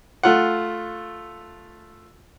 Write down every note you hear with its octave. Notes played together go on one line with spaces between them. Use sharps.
A3 F4 F#5